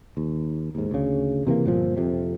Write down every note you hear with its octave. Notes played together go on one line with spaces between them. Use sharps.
D#2
D#2 G#2
D2 C#3
C3 E3 A3 A#3
G1 A#2 F3
F2 C3